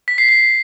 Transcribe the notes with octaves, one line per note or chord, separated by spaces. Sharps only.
B6
C7
C7